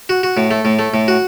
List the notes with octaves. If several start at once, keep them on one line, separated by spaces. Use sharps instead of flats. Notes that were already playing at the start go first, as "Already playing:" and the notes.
F#4
F#4
A2
A3
A2
A3
A2
F#4